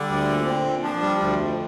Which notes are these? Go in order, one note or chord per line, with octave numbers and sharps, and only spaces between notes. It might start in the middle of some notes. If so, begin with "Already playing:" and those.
Already playing: D3 G3
D2
A#2
C4
A#2
F3 D4
G3
D2
F2